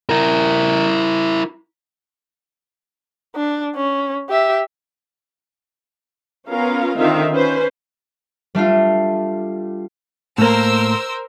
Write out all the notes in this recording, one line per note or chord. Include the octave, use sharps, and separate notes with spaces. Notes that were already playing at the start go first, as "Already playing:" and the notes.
E4 A#4
D4
C#4
G4 E5
B3 C#4 F4 A#4 F5
D3 D#3 C4 F4 E5 F5
C#4 B4 C5
G3 A3 D4 F4
A2 A#3 A#4 C5 E6